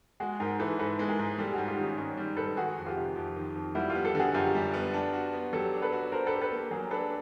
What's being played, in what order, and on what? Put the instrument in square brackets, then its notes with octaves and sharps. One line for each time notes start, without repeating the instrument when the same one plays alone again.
[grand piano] G#3 [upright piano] F#4 G#4
[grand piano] G#2 [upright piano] G#4 A#4
[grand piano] E3 [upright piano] A4 B4
[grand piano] G#2 [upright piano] A4 B4
[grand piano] G#3
[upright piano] G#4 A#4
[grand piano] G#2
[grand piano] G3 [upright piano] G4 A4
[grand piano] G#2 [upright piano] F#4 G#4
[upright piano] F4 G4
[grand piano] D#3
[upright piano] C#4 D#4
[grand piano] G#2 [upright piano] C#4 D#4
[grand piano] G3
[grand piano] G#2 [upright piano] A4 B4
[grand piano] D#3 [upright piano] F#4 G#4
[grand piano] F2
[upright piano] F4 G4
[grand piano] C3
F2
D#3
F2
[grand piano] G3 [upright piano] E4 F#4
[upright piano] F4 G4
[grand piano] B3
[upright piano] G4 A4
[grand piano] D3
[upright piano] F#4 G#4
[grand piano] F#2 [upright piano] F4 G4
[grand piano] G3
B3
D4
F#4
B3
[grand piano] F#3 [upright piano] G4 A4
[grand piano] D4
[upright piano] A4 B4
[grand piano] F#4
[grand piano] D4 [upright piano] A#4 C5
[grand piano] G4 [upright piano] A4 B4
[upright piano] A4 B4
[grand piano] A#3
[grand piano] F#3 [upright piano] G#4 A#4
[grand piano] D4 [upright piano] A4 B4